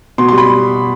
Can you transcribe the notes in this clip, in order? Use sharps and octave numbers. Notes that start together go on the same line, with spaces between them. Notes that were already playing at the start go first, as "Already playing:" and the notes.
B2 C6
C6
G3
B5